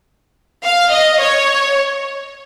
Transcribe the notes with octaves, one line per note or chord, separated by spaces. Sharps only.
F5
D#5
C#5